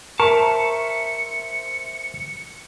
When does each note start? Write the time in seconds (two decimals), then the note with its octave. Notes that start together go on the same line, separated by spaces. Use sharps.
0.20 A#4 C5 E5 A5 C#6 C#7